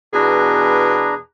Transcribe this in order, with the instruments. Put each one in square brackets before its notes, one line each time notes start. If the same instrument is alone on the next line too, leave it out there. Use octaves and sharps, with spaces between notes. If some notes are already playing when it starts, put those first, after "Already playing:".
[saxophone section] E2 B2 G#4 [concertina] D4 B4 A#5